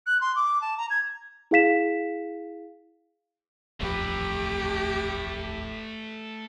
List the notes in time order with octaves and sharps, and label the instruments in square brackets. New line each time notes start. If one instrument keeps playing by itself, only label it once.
[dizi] F#6
C6
D6
A5
A#5
G#6
[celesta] E4 G#4 F5 B6 E7
[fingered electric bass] D#1 A1 F2 [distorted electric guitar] A3 B4 [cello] G4